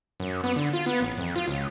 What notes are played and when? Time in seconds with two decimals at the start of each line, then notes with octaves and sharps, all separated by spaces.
0.20 F#2
0.44 B3
0.56 D3
0.73 F4
0.86 B3
1.01 A1
1.18 F2
1.36 F4
1.48 C#2